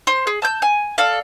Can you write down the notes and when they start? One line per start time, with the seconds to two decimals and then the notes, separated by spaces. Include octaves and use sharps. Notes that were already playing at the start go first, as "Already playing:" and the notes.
0.07 C5 C6
0.27 G#4
0.42 A5 E6 G6
0.62 G#5
0.98 A4 D5 F5